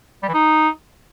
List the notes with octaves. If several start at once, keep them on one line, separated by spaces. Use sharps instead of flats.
G3
E3
D#4